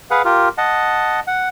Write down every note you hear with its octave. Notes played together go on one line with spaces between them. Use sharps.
G#4 B4 F5 F#5
F4 G4 A#4
D#5 F#5 A5
F#5